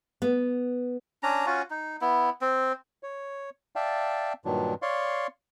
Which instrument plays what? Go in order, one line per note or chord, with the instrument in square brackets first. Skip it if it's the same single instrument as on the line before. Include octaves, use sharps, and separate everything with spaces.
[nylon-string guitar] B3
[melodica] C#4 D4 A#5
C#4 F4 F#4
D#4
B3 E4
C4
[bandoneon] C#5
D5 E5 F5 G5 A5
G2 A#2 D#3 F#3 D4
C#5 D5 F5 C6 C#6